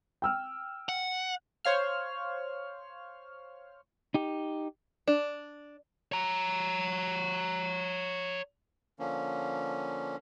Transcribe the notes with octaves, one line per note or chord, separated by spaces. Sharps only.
G5 E6 F6
F#5
C5 C#5 F5 F6
D#4 G4
D4
C#5 A#5
D3 F3 A#3 C#4